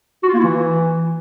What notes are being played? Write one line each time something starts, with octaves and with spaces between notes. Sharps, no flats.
F#4
F4
A#3
E4
E3